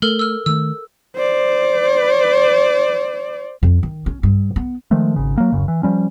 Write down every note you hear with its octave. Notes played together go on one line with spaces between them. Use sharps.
A3 A4 A#4 F6
E6 F6
D#3 A3 E6
C5 D5
F2
D#3
C#4
G2
B3
D#3 F3 G#3 A3
G#1 C#3
F#3 A#3
D1 F#2 C#3
E3
F3 G3 C#4